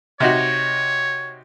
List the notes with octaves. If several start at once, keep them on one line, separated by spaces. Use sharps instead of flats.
C3 D#4 F#4 C#5